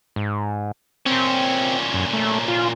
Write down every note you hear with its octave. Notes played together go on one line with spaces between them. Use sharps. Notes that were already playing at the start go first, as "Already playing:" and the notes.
G#2
A#2 C4 C#4
F#2
A3
F4